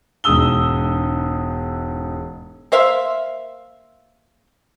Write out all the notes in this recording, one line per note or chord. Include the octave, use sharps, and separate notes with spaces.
E1 G#2 G#3 D#6 E6 G7
A#3 C5 E5 F5